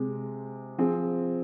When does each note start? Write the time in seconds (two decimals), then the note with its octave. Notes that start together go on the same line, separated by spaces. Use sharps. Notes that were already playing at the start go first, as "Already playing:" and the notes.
Already playing: C3 G#3
0.78 F3 C4 G#4